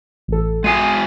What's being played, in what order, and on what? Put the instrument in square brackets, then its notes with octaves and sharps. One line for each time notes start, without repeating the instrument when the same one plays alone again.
[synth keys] A1 A4
[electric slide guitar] G#3 F#4 G#5 [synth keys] D#6 C7 D#7